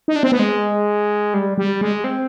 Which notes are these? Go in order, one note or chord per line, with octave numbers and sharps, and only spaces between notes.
D#4
D4
C4
B3
G#3
G3
G3
G#3
C4